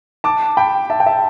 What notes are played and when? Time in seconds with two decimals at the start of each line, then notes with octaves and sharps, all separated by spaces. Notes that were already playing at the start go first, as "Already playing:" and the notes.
0.24 A5 D6
0.57 G5 B5
0.90 E5 A5
1.00 G5
1.06 E5 A5